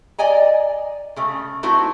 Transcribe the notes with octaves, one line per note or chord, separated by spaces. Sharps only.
D5 D#5 G#5 A#5
C#3 A3
A3 C4 D#4 E4 F#4